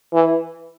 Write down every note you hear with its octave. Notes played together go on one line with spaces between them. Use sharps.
E3